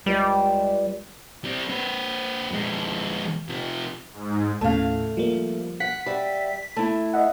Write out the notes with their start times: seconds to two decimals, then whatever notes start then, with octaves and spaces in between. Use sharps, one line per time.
0.06 C#2 G3
1.44 G3 C4
1.69 C4 B4
2.52 F2 G#3
3.49 C3 F3
4.13 G#2
4.61 D#2 A2 C#3 A3 F5
5.17 F3 G3 A#3
5.80 F#5 B6
6.06 G3 E5
6.76 A3 E4
7.13 D#5 E5 F#5